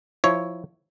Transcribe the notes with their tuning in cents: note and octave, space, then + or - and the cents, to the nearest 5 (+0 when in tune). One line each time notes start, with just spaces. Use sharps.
F3 +0 E4 -10 C#5 +0